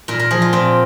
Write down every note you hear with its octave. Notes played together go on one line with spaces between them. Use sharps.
A#2 A#4
A#4
F3 G#4
F4
A#2 C4